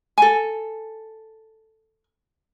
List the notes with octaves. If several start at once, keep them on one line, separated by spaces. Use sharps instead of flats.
A4 G#5